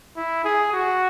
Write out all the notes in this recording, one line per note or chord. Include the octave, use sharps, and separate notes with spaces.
E4
G#4
F#4